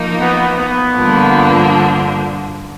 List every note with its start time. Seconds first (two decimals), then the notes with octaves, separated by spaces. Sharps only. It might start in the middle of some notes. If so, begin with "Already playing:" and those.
Already playing: F3 A#3 D#4
0.19 B3
0.57 B3
0.95 G2 D3 F3 A#3 D4